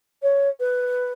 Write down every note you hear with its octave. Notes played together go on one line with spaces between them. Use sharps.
C#5
B4